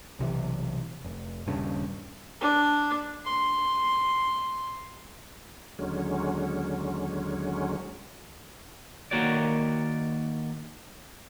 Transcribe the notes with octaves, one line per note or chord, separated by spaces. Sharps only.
B1 C3 E3
F1
D#1 G2 C#3
D4
C6
D#2 D3 F#3 G#3 C#4
D#3 G#3 A#3 F#4 C#5 D5